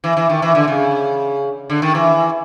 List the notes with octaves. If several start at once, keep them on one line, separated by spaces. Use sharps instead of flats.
E3
E3
D#3
E3
D3
C#3
D3
D#3
E3